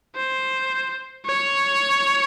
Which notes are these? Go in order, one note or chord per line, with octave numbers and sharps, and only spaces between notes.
C5
C#5